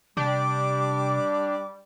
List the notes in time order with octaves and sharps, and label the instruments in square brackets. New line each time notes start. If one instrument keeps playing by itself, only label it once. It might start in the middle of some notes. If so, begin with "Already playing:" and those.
[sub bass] C3 [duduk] G3 [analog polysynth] D4 G4 D5 [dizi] D6